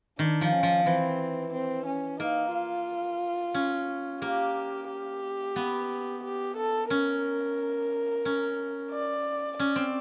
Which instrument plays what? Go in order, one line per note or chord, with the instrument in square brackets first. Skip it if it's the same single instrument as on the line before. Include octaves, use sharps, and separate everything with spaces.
[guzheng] D#3 [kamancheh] D4
[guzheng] F3
[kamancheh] C#4
[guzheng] F3
[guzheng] E3 [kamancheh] C4
[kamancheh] C4
C#4
[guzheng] A#3 [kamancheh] D#4
[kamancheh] F4
[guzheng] C#4
[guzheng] A#3 [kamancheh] G4
[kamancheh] G4
[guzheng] B3
[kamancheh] G4
A4
[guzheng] C#4 [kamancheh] A#4
[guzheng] C#4
[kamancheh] D5
[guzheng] C#4 [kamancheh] D5
[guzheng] C4